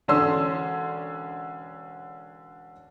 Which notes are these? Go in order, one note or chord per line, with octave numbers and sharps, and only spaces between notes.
E1 D3 C#4 D4 C6 E6